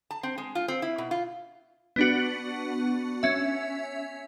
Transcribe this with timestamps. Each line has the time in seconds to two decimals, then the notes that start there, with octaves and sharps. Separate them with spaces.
0.11 A5
0.23 C4
0.38 G#3
0.55 F4
0.68 C4
0.82 E4
0.98 B2
1.11 F4
1.96 B3 D4 F#4
3.23 C#4 E5